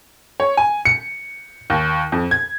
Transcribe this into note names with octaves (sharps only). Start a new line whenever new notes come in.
C#5
G#5
C#7
D#2
F2
G#6